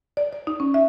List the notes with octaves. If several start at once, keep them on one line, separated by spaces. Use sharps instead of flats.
D5
D5
D#4
C#4
E5